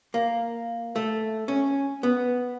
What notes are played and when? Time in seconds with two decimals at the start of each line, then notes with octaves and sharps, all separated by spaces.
0.14 A#3
0.96 A3
1.48 C#4
2.03 B3